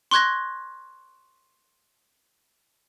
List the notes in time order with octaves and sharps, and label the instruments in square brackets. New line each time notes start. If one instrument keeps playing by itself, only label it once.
[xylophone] C6 C#6 F#6 G#6 A#6